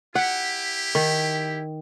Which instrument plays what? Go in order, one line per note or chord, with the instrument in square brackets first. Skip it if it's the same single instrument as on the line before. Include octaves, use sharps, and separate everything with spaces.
[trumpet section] E4 G4 [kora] F#5
[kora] D#3